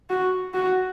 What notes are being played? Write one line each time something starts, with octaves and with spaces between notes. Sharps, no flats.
F#4
F#4